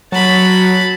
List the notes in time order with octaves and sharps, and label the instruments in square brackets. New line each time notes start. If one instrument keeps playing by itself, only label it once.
[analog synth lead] F#3 [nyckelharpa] A5 B5